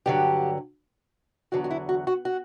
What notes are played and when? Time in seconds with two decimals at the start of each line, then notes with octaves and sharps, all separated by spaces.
0.06 G2 D3 F#3 G4
1.52 E2 D3 F#3 F#4
1.64 F#4
1.71 E4
1.89 F#4
2.07 F#4
2.25 F#4